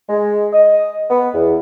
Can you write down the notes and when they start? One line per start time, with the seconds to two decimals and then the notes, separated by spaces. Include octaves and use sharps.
0.09 G#3
0.53 D#5
1.10 B3
1.34 E2